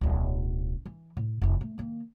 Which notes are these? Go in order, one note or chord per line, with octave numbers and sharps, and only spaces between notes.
D1 B1
E3
A2
F1 E4
A3
D#3 A#3